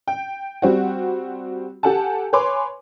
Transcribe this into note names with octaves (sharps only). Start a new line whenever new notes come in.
G5
G3 C4 F#4
G4 A4 F#5 G#5 A5
B4 C#5 G#5 C6 D6